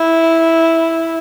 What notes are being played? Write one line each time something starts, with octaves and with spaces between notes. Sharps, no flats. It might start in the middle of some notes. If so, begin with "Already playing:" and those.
Already playing: E4